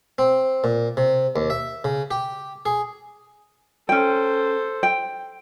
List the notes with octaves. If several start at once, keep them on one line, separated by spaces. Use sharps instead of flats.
C4
A#2
C3
D#2
E5
C#3
G4
G#4
C#4 A4 C5 G5
G5